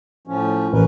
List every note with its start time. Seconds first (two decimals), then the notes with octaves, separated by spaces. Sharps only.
0.27 A2 F3 C#4
0.73 A1 C#4 A#4 B4